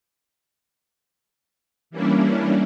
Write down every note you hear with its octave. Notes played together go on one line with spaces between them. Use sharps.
E3 G3 A#3 C#4 D4 E4